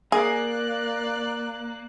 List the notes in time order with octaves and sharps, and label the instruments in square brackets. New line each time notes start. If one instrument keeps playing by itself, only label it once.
[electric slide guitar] A#3 [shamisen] G#4 [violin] D5 F#6